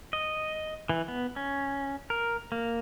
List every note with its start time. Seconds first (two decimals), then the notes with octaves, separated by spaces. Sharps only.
0.13 D#5
0.89 E3
1.08 B3
1.36 C#4
2.10 A#4
2.52 A#3